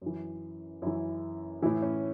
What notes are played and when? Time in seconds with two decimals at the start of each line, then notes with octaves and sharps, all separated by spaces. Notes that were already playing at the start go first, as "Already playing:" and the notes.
0.02 F#2 E3
0.82 F#2 E3 E4
1.62 E3 E4
1.65 A2
1.82 C#4